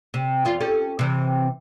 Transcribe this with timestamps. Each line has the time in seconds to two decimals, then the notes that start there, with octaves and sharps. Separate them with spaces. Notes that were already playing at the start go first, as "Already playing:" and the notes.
0.14 C3
0.45 E2 F4
0.60 C#4 G4 A4
0.99 C3 E3